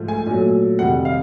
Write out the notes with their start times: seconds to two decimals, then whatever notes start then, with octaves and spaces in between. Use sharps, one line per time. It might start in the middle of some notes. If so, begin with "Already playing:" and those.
Already playing: G#2 F3 A3
0.08 G#5
0.27 A#2 F#3 A3
0.79 F2 C3 D#3 G3 F#5
1.05 F5